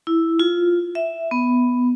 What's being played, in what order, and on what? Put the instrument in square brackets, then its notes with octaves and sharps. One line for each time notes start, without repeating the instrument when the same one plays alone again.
[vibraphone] E4
F4
E5
B3